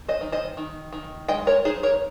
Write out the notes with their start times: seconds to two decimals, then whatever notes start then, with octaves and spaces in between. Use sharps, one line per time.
0.08 C5 D#5
0.21 D#3
0.32 C5 D#5
0.57 D#3
0.93 D#3
1.28 G#3 D#5 G5
1.47 A#4 C#5
1.65 D#4 G#4 C5
1.83 A#4 C#5